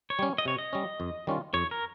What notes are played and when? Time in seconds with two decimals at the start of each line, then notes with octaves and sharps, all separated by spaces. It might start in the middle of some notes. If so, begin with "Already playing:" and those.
0.10 C#5
0.19 G3 C#4
0.38 D#5
0.45 C3 C#5
0.58 D#5
0.73 G3 C#4
1.00 F2
1.27 D#3 G3 C#4 F4
1.53 F2 C#5
1.71 A#4